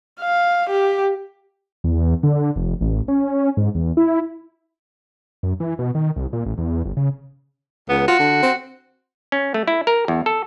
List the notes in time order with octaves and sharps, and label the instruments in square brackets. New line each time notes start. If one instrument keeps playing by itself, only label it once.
[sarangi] F5
G4
[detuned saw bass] E2
D3
F1
A1
C#4
G#2
E2
E4
F#2
E3
B2
D#3
C2
A#2
A1
E2
G1
C#3
[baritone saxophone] C#2 [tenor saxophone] B3
[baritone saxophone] F4 [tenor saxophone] F#4
[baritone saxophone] D3
C4
[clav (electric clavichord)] C#4
A3
E4
A#4
E2
A4